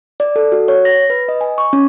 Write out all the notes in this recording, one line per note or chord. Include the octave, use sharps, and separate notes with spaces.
D5
A4
F#4
C#5
A#6
B4
D#5
G#5
C#6
C#4